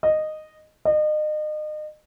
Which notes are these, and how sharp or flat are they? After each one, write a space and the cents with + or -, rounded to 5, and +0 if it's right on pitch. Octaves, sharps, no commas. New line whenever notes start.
D#5 -10
D#5 -35